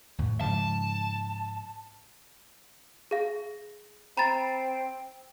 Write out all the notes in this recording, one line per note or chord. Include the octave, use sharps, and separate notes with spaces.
D#2 A2
G#2 C#3 F3 A5
G#4 F5
C4 A#5 B5 A6